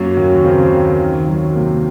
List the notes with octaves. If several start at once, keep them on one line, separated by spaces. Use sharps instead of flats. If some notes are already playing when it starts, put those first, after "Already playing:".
Already playing: F#2 F#3 A#3 C#4
D#2
C#3 C4
D#2
D#3
F#3
C3 A#3